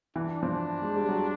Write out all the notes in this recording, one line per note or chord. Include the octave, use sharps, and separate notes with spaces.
E3 D4
F3
G#3
G3
F#3